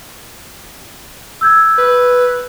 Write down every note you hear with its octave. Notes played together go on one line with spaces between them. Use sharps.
E6 G6 G#6
B4